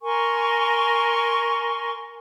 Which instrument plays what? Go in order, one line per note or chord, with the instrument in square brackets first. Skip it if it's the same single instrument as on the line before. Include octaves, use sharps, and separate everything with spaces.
[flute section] A#4 G#5 C6 C#6